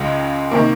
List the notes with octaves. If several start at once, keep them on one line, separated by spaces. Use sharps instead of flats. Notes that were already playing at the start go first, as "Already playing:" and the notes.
Already playing: C#2 C#3 G#3
C3 D#3 A#3